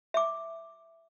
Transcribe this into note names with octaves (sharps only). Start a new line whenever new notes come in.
E5 D6